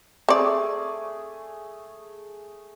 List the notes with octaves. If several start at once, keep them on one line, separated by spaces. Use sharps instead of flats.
A3 C4 G#4 D5